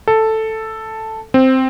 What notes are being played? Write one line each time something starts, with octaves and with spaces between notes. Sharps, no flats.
A4
C4